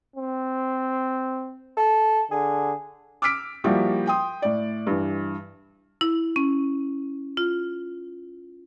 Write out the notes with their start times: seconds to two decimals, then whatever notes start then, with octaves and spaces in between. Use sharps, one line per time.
0.16 C4
1.77 A4
2.31 D3 G#4
3.22 D6 E6 F6 B6 D7
3.64 F3 G3 A#3 E4 F#4 G4
4.07 G5 C6 D#6
4.42 A2 D5
4.87 G2 E3
6.01 E4
6.36 C#4
7.37 F4